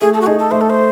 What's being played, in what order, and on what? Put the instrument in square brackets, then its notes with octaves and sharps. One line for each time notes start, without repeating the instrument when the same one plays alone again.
[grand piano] A3 [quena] G#4
[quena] A4
F#4
[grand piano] D#4 A4 [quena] G#4
[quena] A4
[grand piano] A3 [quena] C5
[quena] A4
C5